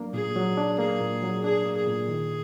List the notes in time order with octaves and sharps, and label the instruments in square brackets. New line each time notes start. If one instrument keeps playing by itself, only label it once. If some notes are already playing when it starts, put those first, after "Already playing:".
Already playing: [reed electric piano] F#3 A#3 D4
[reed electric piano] A#2 [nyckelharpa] G#4
[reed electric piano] F#3
D4
[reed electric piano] A#3 [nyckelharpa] G#4
[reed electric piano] A#2
F#3
[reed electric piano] D4 [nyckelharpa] G#4
[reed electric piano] A#3
[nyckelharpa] G#4
[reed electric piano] A#2
D#3